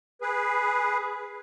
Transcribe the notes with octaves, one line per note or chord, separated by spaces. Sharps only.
G#4 B4